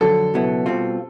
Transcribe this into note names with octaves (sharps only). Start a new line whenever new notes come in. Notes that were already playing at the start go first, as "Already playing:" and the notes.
F2 D3 F#3 A4
C#2 B2 F#3 B3 E4
B2 G3 C4 F4